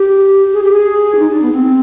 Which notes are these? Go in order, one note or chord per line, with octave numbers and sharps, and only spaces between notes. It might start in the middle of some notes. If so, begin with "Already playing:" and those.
Already playing: G4
G#4
G4
G#4
D4
D#4
D4
B3
C4